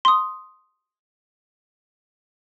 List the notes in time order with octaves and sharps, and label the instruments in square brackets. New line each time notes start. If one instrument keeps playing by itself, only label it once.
[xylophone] C6 D#6